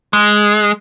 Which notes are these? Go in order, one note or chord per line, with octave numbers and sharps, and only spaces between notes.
G#3